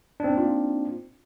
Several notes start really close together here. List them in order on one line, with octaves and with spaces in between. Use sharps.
D4 C4 D#4 A#3 F4